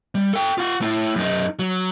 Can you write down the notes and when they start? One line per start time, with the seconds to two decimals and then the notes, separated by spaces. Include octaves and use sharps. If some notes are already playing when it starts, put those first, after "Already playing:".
0.15 G3
0.33 A4 G5
0.58 F4 F#5
0.82 A3 E4
1.16 F#2 D#4
1.59 F#3